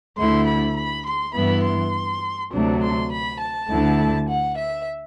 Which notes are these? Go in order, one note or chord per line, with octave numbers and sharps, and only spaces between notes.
D2 D3 A3 E4 C6
B5
B5
C6
G2 E3 B3 E4 B5
C6
D2 C3 F#3 A3 D4
C6
B5
A5
D2 D3 A3 E4
F#5
E5